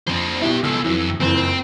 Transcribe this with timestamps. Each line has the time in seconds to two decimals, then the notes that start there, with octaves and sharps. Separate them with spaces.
0.07 F2 D4 C5
0.41 B2 D4 E4 G4
0.63 C#2 B2 A4 E6
0.84 F2 E3 F#3
1.20 F#1 F2 E3 C4